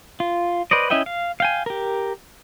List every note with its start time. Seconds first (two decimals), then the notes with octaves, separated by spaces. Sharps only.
0.20 F4
0.71 B4 C5 D5 D#5
0.90 C#4 E4 D#5 E5 G5
1.06 F5
1.40 F5 G5 G#5
1.66 G4 A#4